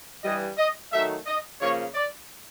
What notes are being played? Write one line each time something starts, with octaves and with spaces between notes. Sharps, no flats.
G2 E3 G3 D#5
D#5
D#3 F#3 A3 E5
D#5
C#3 F3 A#3 C#5
D5